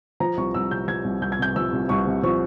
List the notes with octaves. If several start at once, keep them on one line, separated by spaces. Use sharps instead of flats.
F3 A#5
C2 C#6
C2 E6
C3 G6
F3 G#6
C2
C2 G6
G#6
C3 G6
F3 E6
C2
C2 C#6
C3
F3 C#6